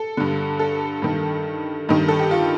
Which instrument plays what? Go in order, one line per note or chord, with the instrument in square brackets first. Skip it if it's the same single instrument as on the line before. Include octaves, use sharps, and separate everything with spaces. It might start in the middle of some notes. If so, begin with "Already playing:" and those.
Already playing: [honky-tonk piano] A4
G2 D3
A4
G2 D#3
G2 D#3 D#4
A4
G4
F4